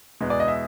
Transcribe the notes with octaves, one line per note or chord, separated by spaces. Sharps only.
E2 B2 G#3 B3
D5
D#5
E5